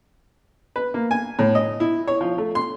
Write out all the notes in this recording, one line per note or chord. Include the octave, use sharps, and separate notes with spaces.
B4
A#3
G#5
A2
D#5
E4
C#5
F3
A3
C6